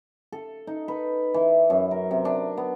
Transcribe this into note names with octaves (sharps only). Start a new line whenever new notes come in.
A4
D#4
B4
E3
F#2
A#4
C3
D4
B3